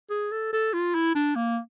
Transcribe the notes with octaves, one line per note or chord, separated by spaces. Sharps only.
G#4
A4
A4
F4
E4
D4
A#3